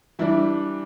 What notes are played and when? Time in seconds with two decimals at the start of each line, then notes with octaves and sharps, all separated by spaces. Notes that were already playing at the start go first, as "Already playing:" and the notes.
0.19 E3 G3 D4 E4